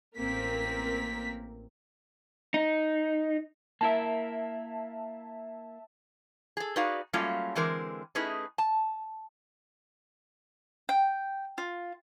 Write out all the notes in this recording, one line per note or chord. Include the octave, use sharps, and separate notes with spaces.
A1 A#3 C4 A#4 B6
D#4
A#3 E4 A#4 E5 A5
G#4 A4
D#4 F#4 G#4 B4 D5 F5
F#3 G3 A3 A#3 C#4 F4
D3 E3 G#3 C4 A#4
A3 C#4 D#4 E4 G#4 B4
A5
G5
F4